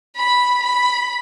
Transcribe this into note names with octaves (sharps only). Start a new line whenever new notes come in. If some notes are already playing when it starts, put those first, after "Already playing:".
B5
B5